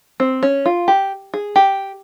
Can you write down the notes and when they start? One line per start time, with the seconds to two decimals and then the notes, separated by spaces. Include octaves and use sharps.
0.20 C4
0.43 C#4
0.66 F4
0.88 G4
1.34 G#4
1.56 G4